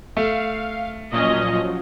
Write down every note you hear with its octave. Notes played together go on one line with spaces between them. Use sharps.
A3 F5
A#2 F3 F#3 C#4 D#5